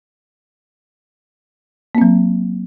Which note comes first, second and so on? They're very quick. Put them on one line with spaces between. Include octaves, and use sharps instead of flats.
A#3 C4 F#3